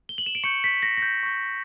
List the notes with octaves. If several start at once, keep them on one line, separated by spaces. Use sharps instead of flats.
G7
F#7
E7
D7
C#6 G6 C#7
B6
A#6
A#6
G6
C#6 G6